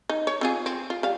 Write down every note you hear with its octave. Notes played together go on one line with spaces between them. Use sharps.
D#4
C#5
C4 F4 G#4
C4
F4
G3 F5